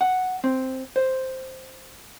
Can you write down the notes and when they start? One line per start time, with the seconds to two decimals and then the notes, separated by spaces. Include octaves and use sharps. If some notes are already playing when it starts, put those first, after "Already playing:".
0.01 F#5
0.44 C4
0.96 C5